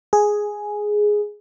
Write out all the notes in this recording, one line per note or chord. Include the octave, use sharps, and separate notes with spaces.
G#4